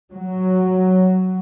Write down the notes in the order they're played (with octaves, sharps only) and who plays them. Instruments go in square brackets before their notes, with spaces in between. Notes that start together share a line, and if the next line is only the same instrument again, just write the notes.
[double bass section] F#3